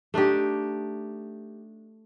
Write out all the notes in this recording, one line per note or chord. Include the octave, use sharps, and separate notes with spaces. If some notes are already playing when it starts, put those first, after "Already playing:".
A3 D4 D#4 G4